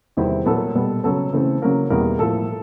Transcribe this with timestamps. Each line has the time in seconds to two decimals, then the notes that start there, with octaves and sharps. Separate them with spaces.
0.17 E2 C3 D#3 G3 C4 E4
0.46 A#2 F#3 B3 A4
0.75 B2 G3 B3
1.04 C#3 F#3 B3 A4
1.33 C#3 E3 A3 C4
1.62 C#3 F#3 A#3 A#4
1.90 E2 B2 G3 A#3 A#4
2.19 A2 F3 A#3 A4